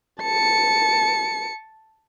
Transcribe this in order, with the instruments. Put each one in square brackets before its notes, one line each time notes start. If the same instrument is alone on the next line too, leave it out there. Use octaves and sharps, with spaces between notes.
[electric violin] A5 C#7